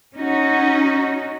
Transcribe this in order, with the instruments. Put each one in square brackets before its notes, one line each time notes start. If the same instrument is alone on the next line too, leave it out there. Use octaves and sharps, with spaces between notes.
[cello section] C#4 D#4 F#4